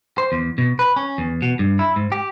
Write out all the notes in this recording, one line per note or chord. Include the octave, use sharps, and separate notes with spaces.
C5
E2
B2
B4
C#4
E2
B2
G2
E4
G#2
G4